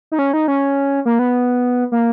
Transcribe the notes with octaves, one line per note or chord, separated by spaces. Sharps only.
D#4
C#4
D#4
C#4
A#3
B3
A#3